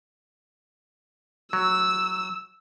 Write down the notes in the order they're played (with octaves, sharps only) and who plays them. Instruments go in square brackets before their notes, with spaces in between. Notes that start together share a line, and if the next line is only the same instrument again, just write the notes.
[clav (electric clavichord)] F#3 [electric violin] E6